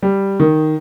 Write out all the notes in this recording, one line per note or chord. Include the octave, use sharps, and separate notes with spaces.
G3
D#3